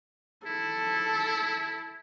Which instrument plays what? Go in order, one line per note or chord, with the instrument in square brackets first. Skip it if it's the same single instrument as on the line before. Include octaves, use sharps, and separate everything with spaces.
[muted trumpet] E4 [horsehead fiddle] A4